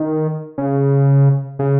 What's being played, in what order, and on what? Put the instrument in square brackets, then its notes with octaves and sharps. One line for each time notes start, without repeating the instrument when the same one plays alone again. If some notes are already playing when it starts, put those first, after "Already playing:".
Already playing: [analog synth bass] D#3
C#3
C#3